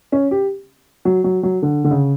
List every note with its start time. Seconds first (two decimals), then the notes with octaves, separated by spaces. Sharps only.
0.12 C#4
0.31 G4
1.05 F#3
1.24 F#3
1.43 F#3
1.62 D3
1.84 D3
1.91 C#3